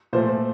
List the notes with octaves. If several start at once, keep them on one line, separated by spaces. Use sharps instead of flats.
A#2 F3 A3 C5